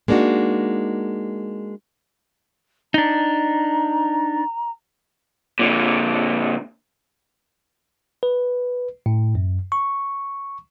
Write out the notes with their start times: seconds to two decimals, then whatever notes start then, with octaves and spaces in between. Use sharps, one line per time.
0.08 G#3 A#3 D4 D#4 F#4
2.94 D4 D#4 A#5
5.59 A#2 D3
8.23 B4
9.06 A2
9.35 F#2
9.72 C#6